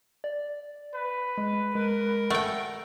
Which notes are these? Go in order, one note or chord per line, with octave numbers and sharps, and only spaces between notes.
D5
B4
G#3
G#3 A#4
A3 F#5 G5